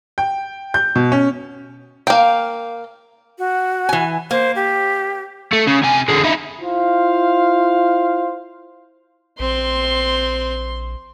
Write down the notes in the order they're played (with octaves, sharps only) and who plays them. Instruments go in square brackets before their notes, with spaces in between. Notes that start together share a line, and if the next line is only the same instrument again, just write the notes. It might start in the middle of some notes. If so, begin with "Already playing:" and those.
[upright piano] G5
G6
B2
C#4
[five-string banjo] A#3 G5 [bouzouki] F5
[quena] F#4
[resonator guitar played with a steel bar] E3 G#5
[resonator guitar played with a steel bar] A#3 [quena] C5
[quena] G4
[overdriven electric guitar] A3
C#3
C3 G#5
D3 G#3
D#4 E4
[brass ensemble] E4 F4 C5 F5
[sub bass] A#1 [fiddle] C4 [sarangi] C6